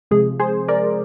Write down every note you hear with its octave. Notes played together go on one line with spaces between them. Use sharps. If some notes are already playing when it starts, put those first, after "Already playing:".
C3 F3 G#3 G#4
G#4 C5
A#4 D5